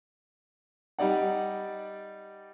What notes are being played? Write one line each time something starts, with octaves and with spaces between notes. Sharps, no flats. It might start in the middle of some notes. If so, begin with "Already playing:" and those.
G3 D#4 D5 F#5